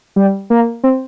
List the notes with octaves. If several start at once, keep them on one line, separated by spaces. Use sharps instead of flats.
G3
A#3
C4